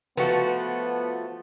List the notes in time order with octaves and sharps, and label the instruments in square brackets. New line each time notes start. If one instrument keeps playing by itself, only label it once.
[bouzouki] F3 A3 F#4 [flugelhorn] B3 [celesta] B4